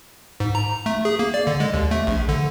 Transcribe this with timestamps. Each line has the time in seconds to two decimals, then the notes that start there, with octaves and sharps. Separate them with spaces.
0.40 G#2
0.55 A#5
0.86 A3
1.05 G#4
1.19 A#3
1.34 D5
1.47 D3
1.60 G#3
1.74 D#2
1.91 A3
2.07 A#1
2.29 D3